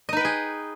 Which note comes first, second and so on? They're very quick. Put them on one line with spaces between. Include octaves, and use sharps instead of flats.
D#5 D#4 B4 G5 G#4